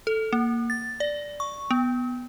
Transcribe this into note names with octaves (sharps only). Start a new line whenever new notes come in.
A4
A#3
A6
D5
C#6
B3